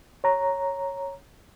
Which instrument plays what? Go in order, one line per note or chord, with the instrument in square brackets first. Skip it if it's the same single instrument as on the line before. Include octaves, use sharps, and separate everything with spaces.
[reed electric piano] C#5 A#5